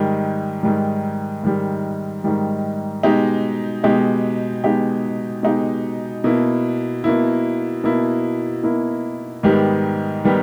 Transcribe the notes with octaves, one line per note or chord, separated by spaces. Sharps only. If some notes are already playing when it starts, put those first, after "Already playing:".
Already playing: G#2 D#3 G3
G#2 D#3 G3
G#2 D#3 G3
G#2 D#3 G3
B2 G#3 D#4 G4
B2 G#3 D#4 G4
B2 G#3 D#4 G4
B2 G#3 D#4 G4
B2 A#3 E4
B2 A#3 E4
B2 A#3 E4
B2 A#3 E4
G#2 D#3 G3 B3 G4
D#3 G3 B3 G4